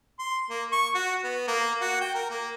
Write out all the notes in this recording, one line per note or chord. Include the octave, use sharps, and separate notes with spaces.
C6
A#3
C#6
F#4
B3
A#3
F#4
G5
A#4
A#3